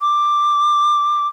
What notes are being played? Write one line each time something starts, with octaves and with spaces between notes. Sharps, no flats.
D6